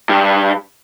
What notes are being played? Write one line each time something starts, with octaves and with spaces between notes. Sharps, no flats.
G2